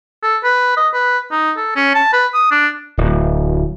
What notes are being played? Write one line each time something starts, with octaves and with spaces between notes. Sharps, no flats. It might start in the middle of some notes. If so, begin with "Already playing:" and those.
A4
B4
D#5
B4
D#4
A4
C#4
A5
B4
D#6
D4
D1